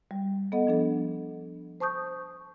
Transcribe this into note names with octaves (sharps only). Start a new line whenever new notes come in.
G3
B3 A4 D#5 F#5
F3 D4 A4
C5 A5 C#6 D#6 G6